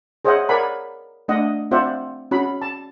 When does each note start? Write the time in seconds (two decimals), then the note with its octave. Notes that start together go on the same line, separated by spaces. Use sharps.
0.25 G#4 C5 C#5 D#5 E5 F#5
0.49 A#4 C#5 D5 F#5 G#5 B5
1.28 A3 D4 D#5 F#5
1.71 C4 F4 C5 D5 E5 F#5
2.31 C#4 F#4 B5
2.62 A5